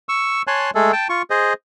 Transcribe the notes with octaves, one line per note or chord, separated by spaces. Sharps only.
C#6 E6
C#5 G#5 A5 C6 F#6
G#3 A3 G#4 A4
G5 A5
F4 C#6
G#4 C5 D#5